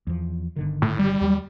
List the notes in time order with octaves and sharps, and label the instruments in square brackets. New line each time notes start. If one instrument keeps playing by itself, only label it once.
[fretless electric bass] E2 F3
G1 D3 D#3
[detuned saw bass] A2
G3
[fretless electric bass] D#2 F#3